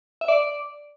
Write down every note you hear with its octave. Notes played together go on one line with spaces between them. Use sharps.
E5
D5